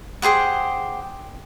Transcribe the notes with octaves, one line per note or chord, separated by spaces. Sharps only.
G4 G#4 C5 F#5